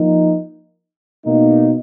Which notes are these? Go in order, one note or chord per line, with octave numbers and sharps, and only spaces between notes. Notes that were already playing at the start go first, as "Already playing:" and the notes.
Already playing: F3 A#3 D#4
B2 A#3 D#4